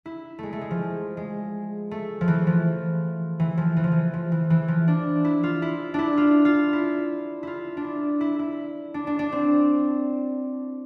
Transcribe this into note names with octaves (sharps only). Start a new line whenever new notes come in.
E4
G#3 A3
A3
G#3
F3
G#3
A3
F3
E3
F3
E3
F3
E3
F3
E3
F3
E3
E3
F3
D4
E4
F4
E4
D4 E4
F4
F4
E4
E4 F4
D4
E4
E4
E4
D4
D4
D4
C4